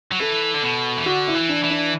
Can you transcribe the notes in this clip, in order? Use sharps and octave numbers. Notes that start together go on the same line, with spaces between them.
F#3
E3 A4
D3
B2
E3
D3 F#4
E4
E3
D4
E3
D4